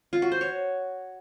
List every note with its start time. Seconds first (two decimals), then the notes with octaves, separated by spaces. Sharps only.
0.13 F4
0.22 F#4
0.32 C5
0.41 C#5